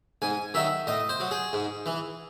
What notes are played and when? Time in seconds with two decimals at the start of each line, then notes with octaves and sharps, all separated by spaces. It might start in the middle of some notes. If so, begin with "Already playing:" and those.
0.22 G#2 G#5
0.54 D#3 F#3 E5
0.87 A2 D#5
1.09 C5
1.20 F#3
1.31 G#4
1.53 G#2
1.86 E3